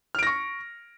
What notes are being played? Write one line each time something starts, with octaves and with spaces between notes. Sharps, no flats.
C#6 F6 A#6 D7